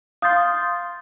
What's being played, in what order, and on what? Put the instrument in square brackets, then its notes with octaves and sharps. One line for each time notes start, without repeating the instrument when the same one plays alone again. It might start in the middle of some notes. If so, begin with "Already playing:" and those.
[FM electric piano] F5 C6 [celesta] D#6 G6 A6